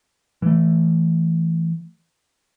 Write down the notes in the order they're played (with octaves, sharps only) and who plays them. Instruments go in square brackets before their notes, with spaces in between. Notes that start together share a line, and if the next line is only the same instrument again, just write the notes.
[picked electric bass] E3 A3